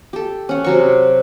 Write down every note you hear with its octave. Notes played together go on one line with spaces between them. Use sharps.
G4 A4
C#4 F#5
C3 F#3 C#6